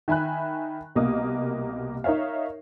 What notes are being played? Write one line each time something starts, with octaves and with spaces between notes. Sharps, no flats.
D#3 E5 G#5 B5 F#6
C2 B2 A#3 D#5 D#6
D#4 A#4 C#5 E5 F5